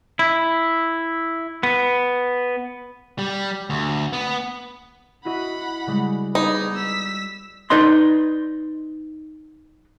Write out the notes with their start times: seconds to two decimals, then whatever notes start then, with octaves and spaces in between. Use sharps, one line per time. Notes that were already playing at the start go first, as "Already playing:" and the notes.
0.19 E4
1.63 B3
3.19 G3
3.70 D2
4.13 B3
5.25 E4 F#4 D#5 F#5 B5
5.87 C#3 G3 G#3
6.35 B3 D#4 G#4 D5 B5
6.74 E6 B6
7.70 D#4 B4 D5 D#5 C6